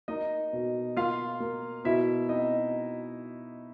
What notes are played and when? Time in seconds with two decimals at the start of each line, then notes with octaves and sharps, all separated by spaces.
0.08 A#3 D#4 D#5
0.53 B2
0.97 A#3 F4 F5
1.40 A#3
1.85 B2 E4 E5
2.29 C4 D#4 D#5